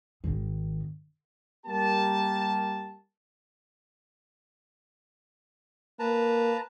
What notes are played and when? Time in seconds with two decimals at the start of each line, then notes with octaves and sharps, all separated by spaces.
0.24 G#1 D#3
1.66 G3 A#3 G4 A#4 A5
5.99 A#3 B4 A5 A#5